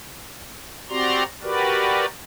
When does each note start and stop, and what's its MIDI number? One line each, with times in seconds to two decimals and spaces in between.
0.89 1.23 60
0.89 1.23 66
0.89 1.23 67
0.89 1.23 74
0.89 1.23 82
0.89 1.23 84
1.43 2.06 66
1.43 2.06 67
1.43 2.06 70
1.43 2.06 71
1.43 2.06 74